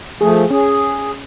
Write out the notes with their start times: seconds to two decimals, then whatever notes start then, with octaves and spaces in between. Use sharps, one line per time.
0.21 F3 A3 G#4
0.50 C#4 G#4